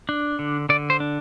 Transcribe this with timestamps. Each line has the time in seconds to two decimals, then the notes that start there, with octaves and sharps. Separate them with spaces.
0.09 D4
0.39 D3
0.69 D3 D5
0.90 C5
1.00 D4